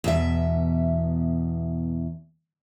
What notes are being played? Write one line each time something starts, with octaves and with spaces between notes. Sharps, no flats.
E2 B2 E5